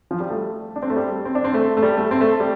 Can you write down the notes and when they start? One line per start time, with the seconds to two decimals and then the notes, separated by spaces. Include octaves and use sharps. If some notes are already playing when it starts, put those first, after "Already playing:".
0.11 F3
0.20 G3
0.30 A3
0.76 D4
0.82 C4
0.90 A3
0.96 G3
1.25 C4
1.35 D4
1.44 C4
1.54 A3
1.77 A3
1.82 G3
1.97 A3
2.11 C4
2.21 A3
2.40 G3